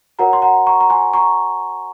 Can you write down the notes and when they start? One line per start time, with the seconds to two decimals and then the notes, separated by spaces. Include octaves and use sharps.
0.19 F#4 A#4 C#5 F#5 A#5
0.33 C6
0.42 F#5 A#5
0.67 A#5 C#6
0.81 A#5
0.90 G#5 C6
1.14 A#5 C#6